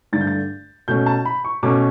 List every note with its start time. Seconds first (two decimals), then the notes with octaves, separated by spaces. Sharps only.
0.13 G2 D3 A3 D4 A6
0.21 G6
0.27 A6
0.88 B2 A3 C#4 G6
1.06 A5
1.25 B5
1.45 C#6
1.63 B2 A3 C#4 D6